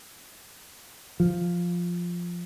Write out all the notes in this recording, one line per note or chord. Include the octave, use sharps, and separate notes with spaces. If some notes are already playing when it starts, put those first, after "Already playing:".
F3